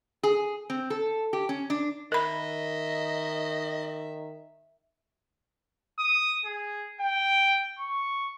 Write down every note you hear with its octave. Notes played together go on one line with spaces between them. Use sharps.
G#4
C4
A4
G4
C#4
D4
D#3 A#4 D#5 E5 B5
D#6
G#4
G5
C#6